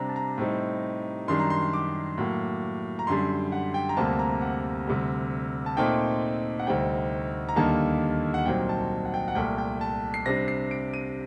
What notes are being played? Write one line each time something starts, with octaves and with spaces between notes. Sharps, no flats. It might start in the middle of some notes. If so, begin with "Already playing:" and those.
Already playing: C3 G3 D4 A#5
A5
A#5
A2 G3 C4 D#4
F#2 D#3 G3 D4 C6
A#5
C6
D6
A2 F#3 A#3
A#5
F#2 D3 G3 C6
F#5
G5
A#5
D2 C3 G3 A#3 A5
A#5
F#5
D2 C3 G3
A5
A#2 A3 C4 D#4 G5
F#5
D2 C3 G3 C4 D#4 G5
A#5
D#2 D3 G3 A#3 D#4 A5
F#5
C2 A#2 F#3 C4 D#4 G5
A5
F#5
G5
F#5
C2 A#2 A3 G5
G5
A5
C7
C3 G3 D4 A#6
C7
D7
D#7